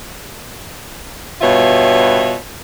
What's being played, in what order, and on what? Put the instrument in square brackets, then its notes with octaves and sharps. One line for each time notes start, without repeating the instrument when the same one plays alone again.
[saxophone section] G2 B2 F4 C#5 E5